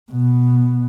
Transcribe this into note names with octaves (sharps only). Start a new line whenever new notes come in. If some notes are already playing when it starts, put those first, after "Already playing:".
B2 B3